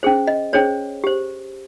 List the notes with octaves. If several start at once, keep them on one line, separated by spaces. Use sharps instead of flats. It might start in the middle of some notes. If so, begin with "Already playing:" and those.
C#4 G#4 C5
D#5
C#4 G#4 C5 C#5
G4 C5